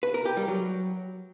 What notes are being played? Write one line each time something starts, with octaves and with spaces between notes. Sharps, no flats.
B4
A#4
G4
G3
F#3